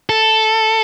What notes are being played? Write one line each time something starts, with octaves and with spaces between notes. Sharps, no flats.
A4